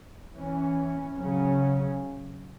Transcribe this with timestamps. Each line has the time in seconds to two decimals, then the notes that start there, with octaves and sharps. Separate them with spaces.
0.34 E3 C#4
1.15 C#3 F#3 C#4